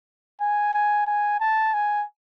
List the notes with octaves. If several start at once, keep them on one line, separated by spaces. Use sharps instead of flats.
G#5
G#5
G#5
A5
G#5